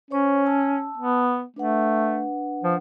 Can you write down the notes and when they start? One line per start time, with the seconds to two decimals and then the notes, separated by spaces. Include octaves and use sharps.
0.11 C#4 C5 C#5 C#6
0.46 A5 E6
0.98 B3
1.56 A3 D4 B4 F#5
2.63 F3